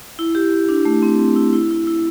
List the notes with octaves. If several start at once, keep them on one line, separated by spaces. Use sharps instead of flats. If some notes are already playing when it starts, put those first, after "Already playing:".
E4
G4
D4
A3
C4
C4
E4
E4
E4
E4